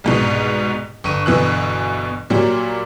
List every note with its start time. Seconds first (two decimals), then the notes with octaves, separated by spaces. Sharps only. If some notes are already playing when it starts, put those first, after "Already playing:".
0.04 C2 G#2 B2
1.04 G1 C#6 D#7
1.26 G1 B2 E3 F#6
2.30 A#2 F#3 G3